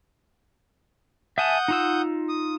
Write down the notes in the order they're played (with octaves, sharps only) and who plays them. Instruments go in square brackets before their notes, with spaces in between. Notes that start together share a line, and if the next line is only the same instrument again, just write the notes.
[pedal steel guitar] E5 G#5 A5 [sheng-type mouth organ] F#5 D#6 G6
[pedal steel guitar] D#4 F4 E6
[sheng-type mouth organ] D#6